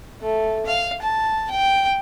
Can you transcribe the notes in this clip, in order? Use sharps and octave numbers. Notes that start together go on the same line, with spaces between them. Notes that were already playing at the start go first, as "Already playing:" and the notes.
A3
F5
A5
G5